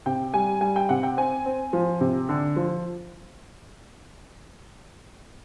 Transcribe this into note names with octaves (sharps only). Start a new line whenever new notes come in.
C3 G5
G3 G#5
G3 G#5
G5
C3 F#5
G5
C4 G#5
C4
F3
C3
D3
F3